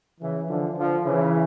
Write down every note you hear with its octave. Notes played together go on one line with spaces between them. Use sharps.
C#3 E3
D3 F3
D3 F3
C#3 E3